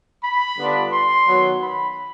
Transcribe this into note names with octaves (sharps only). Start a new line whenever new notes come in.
B5
D3 G3 B3 D4 F4
C6
D#3 F#3 B3
B5